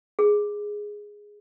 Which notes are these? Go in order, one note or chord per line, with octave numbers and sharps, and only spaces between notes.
G#4